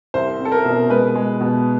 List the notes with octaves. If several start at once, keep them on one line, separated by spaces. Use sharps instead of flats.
C2 C5
C4
A4
A#4
B2
G#3 B4
G#3
B2